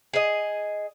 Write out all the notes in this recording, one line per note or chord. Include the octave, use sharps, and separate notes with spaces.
G#4 D#5